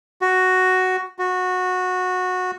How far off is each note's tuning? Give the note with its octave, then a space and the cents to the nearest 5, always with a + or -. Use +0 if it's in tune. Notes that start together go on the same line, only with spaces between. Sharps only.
F#4 +5
F#4 -15